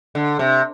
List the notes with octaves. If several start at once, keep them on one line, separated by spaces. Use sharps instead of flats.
D3
C3